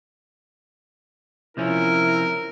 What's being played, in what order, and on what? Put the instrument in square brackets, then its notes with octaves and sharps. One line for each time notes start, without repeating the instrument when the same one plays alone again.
[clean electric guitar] C3 F3 C#4 [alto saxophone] E4 [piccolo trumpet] A#4